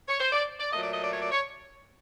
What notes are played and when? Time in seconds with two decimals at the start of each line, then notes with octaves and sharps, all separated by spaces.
0.09 C#5
0.20 C5
0.33 D5
0.60 D5
0.73 A#2 F#3 A3 D#5
0.83 D5
0.92 D#5
1.03 D5
1.13 C#5
1.23 D5
1.31 C#5